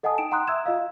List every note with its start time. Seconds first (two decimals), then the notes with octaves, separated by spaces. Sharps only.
0.03 A4 D#5 F#5 G#5 A5 D#6
0.18 D#4 G5 D7 E7
0.31 F#5 A#5 C6 D#6 F#6
0.47 E5 E6 G#6 E7
0.66 F4 D#5 F5